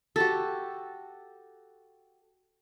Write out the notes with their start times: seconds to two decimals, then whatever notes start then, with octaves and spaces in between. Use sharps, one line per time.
0.16 F#4 G4 A4